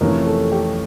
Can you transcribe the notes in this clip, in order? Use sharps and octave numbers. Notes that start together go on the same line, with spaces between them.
F2 C3 E3 A3 C#4 A#4
A4
G4